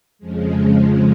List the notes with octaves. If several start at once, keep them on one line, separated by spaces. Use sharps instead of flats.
F2 C#3 F3 G#3